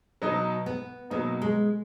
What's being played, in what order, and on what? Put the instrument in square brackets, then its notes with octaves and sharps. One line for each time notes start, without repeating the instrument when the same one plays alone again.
[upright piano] B2 F#3 B3 D#4
[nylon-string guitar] B3
[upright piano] B2 F#3 B3 D#4 [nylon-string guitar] A#3
[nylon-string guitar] G#3